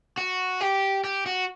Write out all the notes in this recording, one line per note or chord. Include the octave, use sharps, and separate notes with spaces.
F#4
G4
G4
F#4